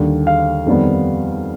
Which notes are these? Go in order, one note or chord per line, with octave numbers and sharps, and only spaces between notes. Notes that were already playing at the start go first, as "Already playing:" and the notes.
Already playing: D#2 D3 G3
F5
F2 D#3 G3 B3